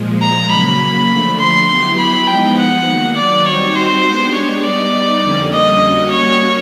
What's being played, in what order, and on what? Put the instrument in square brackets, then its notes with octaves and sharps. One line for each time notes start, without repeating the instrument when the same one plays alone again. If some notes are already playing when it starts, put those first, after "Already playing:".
Already playing: [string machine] A#2 F3 G#3
[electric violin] A#5
[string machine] C#3 F#3 A#3 [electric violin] B5
[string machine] D3 F3 A3
[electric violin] C6
[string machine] F#3 B3 E4 G4
[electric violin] B5
[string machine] F3 G#3 B3 D#4 [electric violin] G5
[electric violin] F#5
[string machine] D#3 F#3 A#3
[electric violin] D5
[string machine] G3 C4 D#4 F#4 [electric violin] C#5
[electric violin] C5
[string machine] G#3 B3 D4 G4
[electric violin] C#5
[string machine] G3 B3 D#4 [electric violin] D5
[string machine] F2 D3 G3 A#3 C#4
[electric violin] D#5
[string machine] G3 A#3 C#4 F#4
[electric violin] C#5